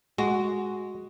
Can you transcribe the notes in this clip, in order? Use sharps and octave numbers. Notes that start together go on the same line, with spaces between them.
G#3 F#4